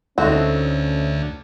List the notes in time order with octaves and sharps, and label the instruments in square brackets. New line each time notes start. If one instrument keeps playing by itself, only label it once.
[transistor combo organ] D2 [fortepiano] A3 D#4 [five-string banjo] C4 F#4 [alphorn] C#4